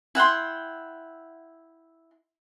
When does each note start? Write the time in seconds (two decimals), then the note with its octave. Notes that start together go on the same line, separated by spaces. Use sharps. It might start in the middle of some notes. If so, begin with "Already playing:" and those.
0.15 E4 F#5 G5 C6